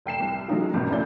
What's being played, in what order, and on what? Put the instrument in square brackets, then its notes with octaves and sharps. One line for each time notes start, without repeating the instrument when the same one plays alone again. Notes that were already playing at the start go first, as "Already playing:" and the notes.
[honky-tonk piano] F1 G5 C7 E7
C2
F#3 G#3 A3 C#4 D#4 F4
G#1 F#2 B2
F1 D2 C#4 E4 D5 G6